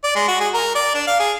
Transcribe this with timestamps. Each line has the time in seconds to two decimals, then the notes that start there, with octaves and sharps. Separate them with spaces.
0.04 D5
0.16 G#3
0.28 F#4
0.40 G#4
0.54 A#4
0.75 D5
0.95 D4
1.07 F5
1.19 G#4